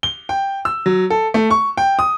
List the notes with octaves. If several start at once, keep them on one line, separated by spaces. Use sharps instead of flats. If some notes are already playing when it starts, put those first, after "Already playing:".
G7
G5
E6
F#3
A4
A3
C#6
G5
D#6